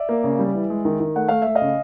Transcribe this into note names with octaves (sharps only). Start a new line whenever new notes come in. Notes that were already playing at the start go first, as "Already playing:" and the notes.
Already playing: D5 E5
A#3
C#3
G3
E3
G#3
D#3
D#3
A3 F#5
A3 F5
A3 E5
D#5 F5
C#3